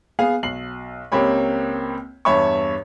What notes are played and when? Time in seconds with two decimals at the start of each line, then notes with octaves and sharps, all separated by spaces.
0.19 B3 G#4 F5
0.43 B1 C7 F#7
1.12 C#2 A#3 C4 G4 C#5 B5
2.25 E2 G2 C#5 E5 B5 C#6